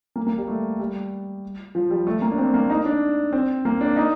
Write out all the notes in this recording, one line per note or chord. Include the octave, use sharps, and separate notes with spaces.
A#3
A#3
G3
A3
G3
F3
G3
A3
A#3
D4
C4
A#3
D#4
D4
C4
A#3
D4
D#4